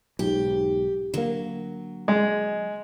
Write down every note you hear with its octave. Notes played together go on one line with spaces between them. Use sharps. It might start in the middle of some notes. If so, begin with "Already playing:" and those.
B1 G#2 G4
D3 F#3 A#3
G#3